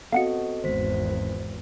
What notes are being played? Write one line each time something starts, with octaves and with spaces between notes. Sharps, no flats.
B3 C4 F#4 A4 D#5 F5 F#5 C#7
G#1 E2 D#3 G#3 B3 C5 B6